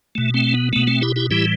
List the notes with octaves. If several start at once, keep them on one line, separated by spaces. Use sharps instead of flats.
B2 A3
A3 C4
B3
B2 A3 B3
A3 C4
E4 G4
E4 G4
A2 E3 G3 E4 G4